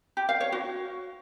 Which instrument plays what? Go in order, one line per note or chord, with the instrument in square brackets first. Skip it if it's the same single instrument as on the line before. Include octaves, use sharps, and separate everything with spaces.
[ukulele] G4
F5
C#5
F#4